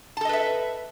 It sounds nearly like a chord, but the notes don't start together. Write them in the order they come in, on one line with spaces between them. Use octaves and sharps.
A5 A4 D#5 B4 E5